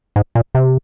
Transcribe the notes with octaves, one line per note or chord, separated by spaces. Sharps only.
G#2
A#2
C3